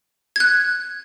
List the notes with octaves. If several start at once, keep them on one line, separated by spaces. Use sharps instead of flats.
G#6
F#6